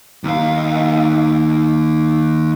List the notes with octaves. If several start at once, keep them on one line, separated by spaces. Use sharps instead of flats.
D#2 F5